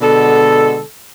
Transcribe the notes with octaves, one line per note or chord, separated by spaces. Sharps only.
B2 D3 G#3 A4